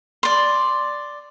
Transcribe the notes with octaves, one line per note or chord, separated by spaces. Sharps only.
D5 C6